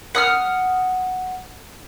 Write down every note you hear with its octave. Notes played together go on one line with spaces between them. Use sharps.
F#5 D#6 F6